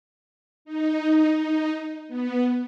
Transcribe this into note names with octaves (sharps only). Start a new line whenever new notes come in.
D#4
D#4
B3